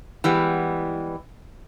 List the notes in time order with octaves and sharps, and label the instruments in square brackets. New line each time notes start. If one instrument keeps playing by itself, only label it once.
[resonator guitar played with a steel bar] E3 G3 G#3 B3